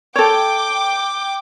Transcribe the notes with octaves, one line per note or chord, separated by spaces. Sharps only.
A4 C#5 G5 D6